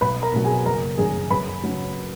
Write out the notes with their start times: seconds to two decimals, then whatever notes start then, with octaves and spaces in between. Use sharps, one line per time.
0.01 B1 B4 B5
0.22 A#4 A#5
0.34 B2 F#3
0.44 G#4 G#5
0.66 F#1 A#4 A#5
0.98 F#2 D#3 G#4 G#5
1.30 F#2 B4 B5
1.63 C#3 F#3